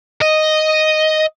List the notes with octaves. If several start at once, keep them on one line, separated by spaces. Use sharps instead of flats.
D#5